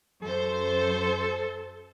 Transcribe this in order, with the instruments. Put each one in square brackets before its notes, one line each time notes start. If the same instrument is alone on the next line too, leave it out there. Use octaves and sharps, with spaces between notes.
[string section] F#2 C5 [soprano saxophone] A4